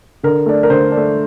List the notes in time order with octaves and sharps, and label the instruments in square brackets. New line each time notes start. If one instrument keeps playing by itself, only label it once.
[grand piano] D3 A#4
A3 D4
A#4
D3 C5
D4
A3